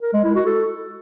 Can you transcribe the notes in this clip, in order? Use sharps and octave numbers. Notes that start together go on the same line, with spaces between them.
A#4
G#3
E4
F#4
A4